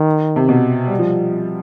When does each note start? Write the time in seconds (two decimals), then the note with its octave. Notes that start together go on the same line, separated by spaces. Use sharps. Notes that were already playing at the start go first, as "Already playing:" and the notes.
Already playing: D#3
0.36 C3
0.49 B2
0.87 G3
0.99 F3